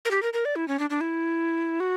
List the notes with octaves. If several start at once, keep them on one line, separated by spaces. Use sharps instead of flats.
A#4
G4
A#4
A#4
D5
E4
C#4
D4
D4
E4
F#4